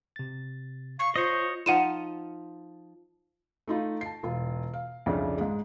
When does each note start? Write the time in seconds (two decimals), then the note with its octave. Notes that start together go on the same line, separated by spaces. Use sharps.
0.16 C3 A6
0.99 F5 C#6 C7
1.16 F4 C5 C#5 D#5
1.66 F3 D#4 F4 F#5 D#7 E7
3.67 A3 D#4 F4
4.01 A5 C7
4.23 E1 F4
4.74 F5
5.06 C2 F2 C#3 F3 C#4 D4
5.38 G#2 G#3